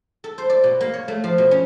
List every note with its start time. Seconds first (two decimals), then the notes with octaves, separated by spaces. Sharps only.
0.24 A4
0.38 C5
0.50 D5
0.64 B2
0.81 A#3
0.94 C#5
1.08 A3
1.24 F3
1.38 B2
1.51 C#4